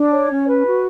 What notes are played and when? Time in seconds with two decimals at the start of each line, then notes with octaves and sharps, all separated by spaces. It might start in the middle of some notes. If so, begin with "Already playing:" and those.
Already playing: D4
0.11 C#5
0.29 C#4
0.47 B4
0.65 F#4